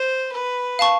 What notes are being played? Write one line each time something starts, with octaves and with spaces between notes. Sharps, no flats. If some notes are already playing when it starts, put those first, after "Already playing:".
Already playing: C5
B4
F5 A5 C#6